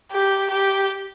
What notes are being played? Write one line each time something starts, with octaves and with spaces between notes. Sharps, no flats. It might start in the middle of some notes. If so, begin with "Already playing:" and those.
G4
G4